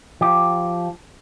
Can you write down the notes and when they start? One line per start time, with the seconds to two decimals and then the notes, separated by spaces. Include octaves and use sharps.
0.21 F3 G4